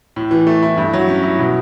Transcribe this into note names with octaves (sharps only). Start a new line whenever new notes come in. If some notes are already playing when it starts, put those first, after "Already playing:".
A2
E3
A3
E4
G2
F#3
C#4
E4
B2